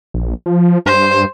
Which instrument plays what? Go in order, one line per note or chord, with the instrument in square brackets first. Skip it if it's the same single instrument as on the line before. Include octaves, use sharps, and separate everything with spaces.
[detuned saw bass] A#1
F3
[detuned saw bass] G2 [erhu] C5